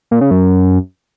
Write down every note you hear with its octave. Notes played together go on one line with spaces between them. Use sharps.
A#2
C#3
F#2